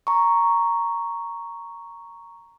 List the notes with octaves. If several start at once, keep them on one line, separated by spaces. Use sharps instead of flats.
A#5 C#6